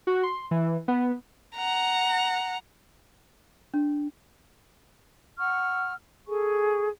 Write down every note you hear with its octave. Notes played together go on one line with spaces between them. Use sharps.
F#4
C6
E3
B3
F#5 A#5
D4
F#5 C#6 E6 F6
G#4 A4 G#5 C#6